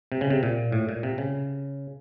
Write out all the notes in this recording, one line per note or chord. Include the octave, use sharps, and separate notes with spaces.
C3
C#3
C3
A#2
A2
A#2
C3
C#3